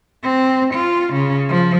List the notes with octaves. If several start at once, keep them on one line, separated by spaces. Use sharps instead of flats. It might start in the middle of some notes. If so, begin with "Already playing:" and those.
C4
F4
C#3
F3